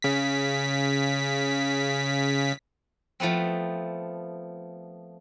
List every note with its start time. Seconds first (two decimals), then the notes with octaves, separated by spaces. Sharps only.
0.02 C#3 B6
3.20 F3 A3 B3 C4